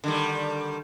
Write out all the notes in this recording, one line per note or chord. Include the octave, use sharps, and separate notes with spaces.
D3 D#3 G3